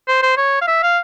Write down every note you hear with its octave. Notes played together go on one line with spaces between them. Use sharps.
C5
C5
C#5
F5
E5
F5